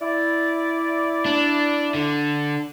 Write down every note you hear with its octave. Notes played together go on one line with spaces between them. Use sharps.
E4 D5
D4
D3